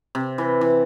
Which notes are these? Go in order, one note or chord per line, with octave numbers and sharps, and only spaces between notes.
C3
E3
E3